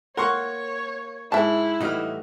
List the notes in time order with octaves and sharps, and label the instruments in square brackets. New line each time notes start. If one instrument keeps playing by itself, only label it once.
[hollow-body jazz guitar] A#3 A#4 [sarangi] C#5 [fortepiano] F#5 C6 C#6
[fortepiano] G#2 [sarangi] E4 [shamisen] E5 A5
[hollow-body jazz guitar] A2 E3 G3 [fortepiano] D#4 F#4 F6